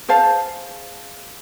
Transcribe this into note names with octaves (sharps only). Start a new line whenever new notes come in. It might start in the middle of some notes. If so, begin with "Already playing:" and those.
G#4 C5 F5 A5